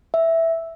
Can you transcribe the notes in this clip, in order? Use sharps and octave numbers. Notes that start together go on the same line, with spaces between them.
E5